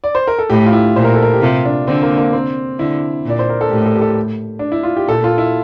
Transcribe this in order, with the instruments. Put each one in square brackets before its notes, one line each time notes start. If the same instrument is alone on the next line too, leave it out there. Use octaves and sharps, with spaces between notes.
[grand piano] D5
C5
A#4
A4
[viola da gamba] A2 [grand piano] G4
[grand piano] F4
E4
[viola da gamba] A#2 [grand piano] C5
[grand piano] A#4
A4
A#4
G4
[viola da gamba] C3 [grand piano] F4
[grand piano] D4
[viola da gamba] D3 [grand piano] C4
[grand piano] A#3
A#3
C4
[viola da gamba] D3 [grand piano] E4
[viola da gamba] A#2 [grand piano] D5
[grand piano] C5
A#4
A4
[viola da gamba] A2 [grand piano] G4
[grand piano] A4
G4
A4
D4
E4
F4
G4
[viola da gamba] A#2 [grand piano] A4
[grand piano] F4
E4